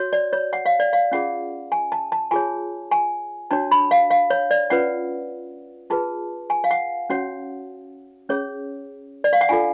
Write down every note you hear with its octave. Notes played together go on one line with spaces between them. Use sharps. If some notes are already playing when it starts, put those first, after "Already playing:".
Already playing: F#4 C#5
D5
C#5
F#5
F5
D5
F5
C#4 F4 G#4 F#5
G#5
A5
A5
F4 G#4 C#5 G#5
G#5
D4 F#4 C#5 A5
B5
F5
F5
C#5
D5
C#4 F4 B4 F#5
F4 G#4 B4 A5
G#5
F5
F#5
C#4 F#4 C#5 F#5
C#4 G#4 C#5
D5
F5
F#5
D4 F4 A4 G#5